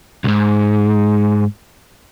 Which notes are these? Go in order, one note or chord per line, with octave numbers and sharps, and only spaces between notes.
C2 G#2